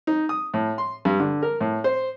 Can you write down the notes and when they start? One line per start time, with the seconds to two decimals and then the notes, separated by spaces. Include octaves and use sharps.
0.07 D#4
0.29 D#6
0.54 A2
0.78 C6
1.05 G2
1.20 D3
1.43 A#4
1.61 A2
1.84 C5